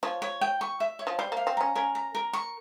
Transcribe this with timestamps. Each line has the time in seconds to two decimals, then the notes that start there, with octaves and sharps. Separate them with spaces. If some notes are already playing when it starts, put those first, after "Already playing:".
0.03 F3 C#5
0.22 C#5
0.41 G5
0.61 C#6
0.80 E5
0.99 C#5
1.07 F3
1.19 G3 C5
1.32 A#3 F5
1.47 C4
1.57 C#4 A#5
1.75 C#4 A#4
1.95 A#5
2.15 A#4
2.33 C#6